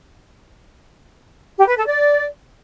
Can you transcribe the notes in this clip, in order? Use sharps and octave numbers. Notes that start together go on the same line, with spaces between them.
G4
B4
A4
D5